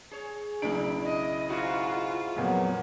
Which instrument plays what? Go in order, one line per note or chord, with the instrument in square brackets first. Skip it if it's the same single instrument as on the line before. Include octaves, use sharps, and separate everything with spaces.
[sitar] G#4 C#5
[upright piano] B1 C#3 D7 [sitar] D4 [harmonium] E4
[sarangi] D#5
[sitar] G#2 F#4 [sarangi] F4
[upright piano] F2 A#2 [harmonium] F#3 B3